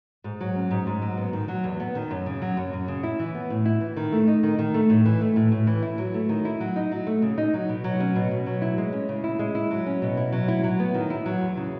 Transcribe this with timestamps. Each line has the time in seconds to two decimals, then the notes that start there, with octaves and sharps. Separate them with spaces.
0.24 G#2
0.41 F#3
0.56 C#4
0.71 G#2
0.87 G#2
1.02 F#3
1.17 B3
1.33 D#3
1.48 F#3
1.64 E2
1.80 B3
1.95 D#3
2.11 F#2
2.26 C#3
2.42 F#3
2.57 F#2
2.73 F#2
2.88 C#3
3.03 E4
3.20 E3
3.35 B3
3.50 A2
3.65 E4
3.81 E3
3.96 D#3
4.12 A3
4.27 D#4
4.43 D#3
4.59 D#3
4.74 A3
4.90 A2
5.06 E3
5.21 A3
5.36 A2
5.52 A2
5.67 E3
5.83 E4
5.98 F#3
6.14 A3
6.29 D#3
6.45 E4
6.60 F#3
6.76 D#4
6.92 F#3
7.07 A3
7.22 C#3
7.38 D#4
7.54 F#3
7.69 B2
7.84 F#3
8.00 C#4
8.16 B2
8.31 B2
8.46 F#3
8.62 E4
8.78 G#3
8.93 C#4
9.09 C#3
9.24 E4
9.39 G#3
9.55 E4
9.71 F#3
9.86 C#4
10.02 B2
10.17 E4
10.32 F#3
10.48 E4
10.64 F#3
10.80 B3
10.94 D#3
11.10 E4
11.26 F#3
11.41 E2
11.57 C#3